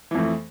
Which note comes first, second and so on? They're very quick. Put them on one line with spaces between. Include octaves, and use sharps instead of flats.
E3 F2 A3